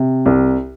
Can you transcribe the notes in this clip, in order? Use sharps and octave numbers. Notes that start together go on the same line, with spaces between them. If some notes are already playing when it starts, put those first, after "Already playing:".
Already playing: C3
C2